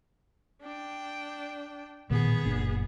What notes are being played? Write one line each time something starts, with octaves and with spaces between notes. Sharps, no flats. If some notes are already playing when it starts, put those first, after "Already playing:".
D4 G5
A1 A#2 D#3 B3 G#4
F#1 A#2 D4